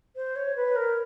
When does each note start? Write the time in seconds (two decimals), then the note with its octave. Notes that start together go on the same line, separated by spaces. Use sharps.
0.16 C5
0.36 C#5
0.56 B4
0.76 A#4